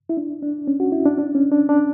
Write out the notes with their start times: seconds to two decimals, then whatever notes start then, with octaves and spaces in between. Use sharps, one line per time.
0.09 E4
0.17 D4
0.43 D4
0.67 C#4
0.80 F#4
0.92 E4
1.05 D4
1.18 D4
1.35 C#4
1.52 D4
1.69 D4